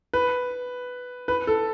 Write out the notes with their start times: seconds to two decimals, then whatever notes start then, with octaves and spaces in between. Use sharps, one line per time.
0.13 B4
1.28 B4
1.47 A4